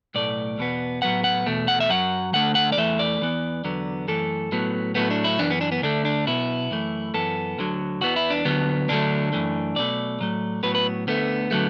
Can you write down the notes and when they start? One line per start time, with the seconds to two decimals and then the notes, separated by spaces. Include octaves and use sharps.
0.14 B1 A2 A3 D5
0.58 E2 B2 B3
1.02 A2 F#3 B3 F#5
1.24 F#5
1.47 E2 B2 A3
1.68 F#5
1.80 E5
1.89 F#2 F#3 F#5
2.33 D2 D3 A3 F#5
2.55 F#5
2.72 D5
2.77 E2 E3 A3 E5
2.99 D5
3.21 E2 E3 B3
3.64 E2 D3 F#3 B3
4.08 F#2 E3 A3 A4
4.52 A2 F#3 B3
4.95 A2 F#3 A3 B3
5.10 D4
5.24 E4
5.39 F#2 E3 B3 D4
5.50 B3
5.61 D4
5.72 B3
5.83 D2 D3 A3 D4
6.05 D4
6.27 B1 B2 B3 E4
6.71 F#2 E3 A3
7.14 F#2 E3 B3 A4
7.58 D2 D3 F#3
8.01 E2 E3 B3 F#4
8.16 E4
8.30 D4
8.45 D2 D3 F#3 B3
8.89 D2 D3 F#3 A3 D4
9.33 F#2 E3 A3
9.76 B1 B2 A3 D5
10.20 A2 F#3 A3
10.63 A2 F#3 B3 B4
10.75 B4
11.07 D2 D3 A3 B3
11.51 D3 F#3 A3